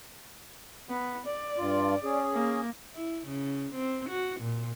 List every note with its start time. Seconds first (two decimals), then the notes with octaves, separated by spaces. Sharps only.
0.89 B3
1.26 D5
1.59 G2 F4
2.04 C#4 G#4
2.33 A#3
2.95 E4
3.27 C#3
3.74 C4
4.10 F#4
4.41 A#2